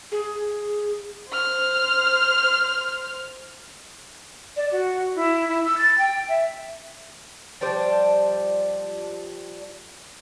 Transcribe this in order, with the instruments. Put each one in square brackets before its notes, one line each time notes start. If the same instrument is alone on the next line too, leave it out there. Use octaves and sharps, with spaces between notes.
[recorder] G#4
[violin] C5 F6
[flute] D5
F#4
E4
E4
E6
A6
G5
E5
[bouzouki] F3 G3 D4 C5